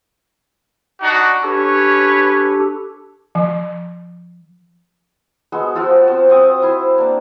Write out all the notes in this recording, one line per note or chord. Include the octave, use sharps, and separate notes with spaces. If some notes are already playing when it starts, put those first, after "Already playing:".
D4 D#4 F#4
C#4 D4 G4 A4 B4 C#5
F3
G#3 B3 F#4 A4
F3 F4 F#4 E6
C4 A5
C4 C#6 D#6
E4 C5 C6
A#3 D4